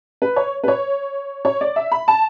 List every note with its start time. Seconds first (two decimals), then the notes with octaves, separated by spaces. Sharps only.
0.22 B4
0.36 C#5
0.64 B4
0.68 C#5
1.45 C#5
1.61 D5
1.76 E5
1.92 B5
2.08 A5